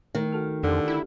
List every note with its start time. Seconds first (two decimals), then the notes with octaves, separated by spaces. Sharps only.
0.15 D#3 A3
0.32 F#4 A4 F6
0.63 F2 D3 D4 G4
0.88 E4